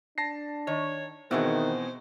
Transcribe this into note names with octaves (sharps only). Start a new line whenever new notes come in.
D4 A5 A#6 C7
D#3 C#5
B2 D#3 E3 B3 C4 F#4 G#4 C5